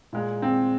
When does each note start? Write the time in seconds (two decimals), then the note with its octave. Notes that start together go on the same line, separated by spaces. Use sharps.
0.13 A#2 G#3
0.42 C4